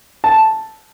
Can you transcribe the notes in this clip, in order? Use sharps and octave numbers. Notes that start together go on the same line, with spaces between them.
A5